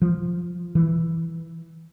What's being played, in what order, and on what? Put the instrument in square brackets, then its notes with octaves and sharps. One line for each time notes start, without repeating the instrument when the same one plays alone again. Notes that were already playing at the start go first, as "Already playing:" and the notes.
[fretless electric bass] F3
E3